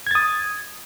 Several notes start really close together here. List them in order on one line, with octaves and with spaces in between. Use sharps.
G#6 A6 D#6